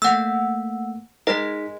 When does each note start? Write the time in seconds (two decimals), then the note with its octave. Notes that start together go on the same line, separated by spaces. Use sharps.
0.02 A3 A#3 F#5 E6
1.27 G#3 D#4 G#4 A#4 D#5 B6